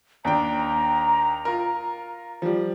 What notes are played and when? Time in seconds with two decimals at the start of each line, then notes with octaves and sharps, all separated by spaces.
0.25 D#2 D4 G5 A#5
1.45 F4 A#4
2.42 F3 G3